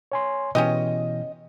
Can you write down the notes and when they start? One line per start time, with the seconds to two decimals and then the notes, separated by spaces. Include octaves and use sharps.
0.12 C#5 G#5 C6
0.55 B2 E3 C#4 G4 D#5